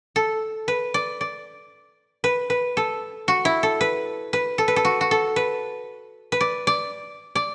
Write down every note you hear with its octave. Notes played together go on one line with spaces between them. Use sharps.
A4
B4
D5
D5
B4
B4
A4
F#4
E4
A4
B4
B4
A4
B4
A4
F#4
F#4
A4
B4
B4
D5
D5
D5